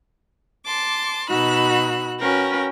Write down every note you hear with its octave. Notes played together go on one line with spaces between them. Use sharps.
A5 C6 D6
B2 D#4 F#4 B5 E6 F#6
C#4 F#4 A#4 B4 G5